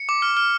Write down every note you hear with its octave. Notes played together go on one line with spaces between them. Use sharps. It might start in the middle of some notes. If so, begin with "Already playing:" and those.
Already playing: C#7
D6
F6
F6